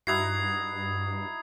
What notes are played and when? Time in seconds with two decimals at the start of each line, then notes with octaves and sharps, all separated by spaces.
0.07 G2 D#4 E4 F#4 D#6 G#6 C7